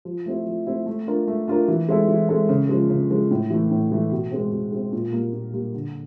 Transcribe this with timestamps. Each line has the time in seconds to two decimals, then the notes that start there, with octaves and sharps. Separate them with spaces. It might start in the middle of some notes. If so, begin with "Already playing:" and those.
0.05 F3
0.26 A3 C4 E4
0.46 F3
0.67 A3 C4 E4
0.86 A3
1.07 D4 F4 A#4
1.27 A3
1.48 D4 F4 A#4
1.68 E3
1.89 G#3 C4 E4 A4
2.08 E3
2.29 G#3 C4 E4 A4
2.49 C#3
2.69 F3 G#3
2.90 C#3
3.11 F3 G#3
3.31 A2
3.50 E3 A3
3.71 A2
3.91 E3 A3
4.12 B2
4.31 G#3 C4
4.52 B2
4.73 G#3 C4
4.93 A#2
5.13 G3 A#3
5.33 A#2
5.53 G3 A#3
5.74 D3